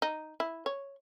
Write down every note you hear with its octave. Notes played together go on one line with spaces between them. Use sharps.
D#4
E4
C#5